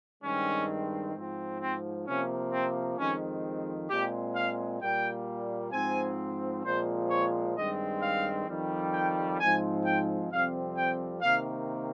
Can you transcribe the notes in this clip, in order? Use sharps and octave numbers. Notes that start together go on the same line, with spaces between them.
G2 D#3 G#3 C4 C#4
G#2 F3 C4
C4
C3 F3 A#3 C#4
C4
F2 D#3 G#3 C4 C#4
A#2 G#3 C4 G4
F5
A#2 G3 A#3 G5
G#2 F3 C4 G#5
A#2 F3 G#3 C4 C5
C#5
G2 D#3 G#3 C4 D#5
F5
F2 D#3 G3
G5
G#2 F3 G#3 C4 G#5
G5
F2 C3 G3 C4 F5
G5
C3 D#3 A#3 F5